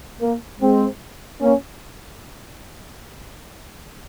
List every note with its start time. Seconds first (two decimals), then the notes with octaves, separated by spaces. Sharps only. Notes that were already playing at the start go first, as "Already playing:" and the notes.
0.21 A#3
0.61 G#3 C4
1.41 A#3 C#4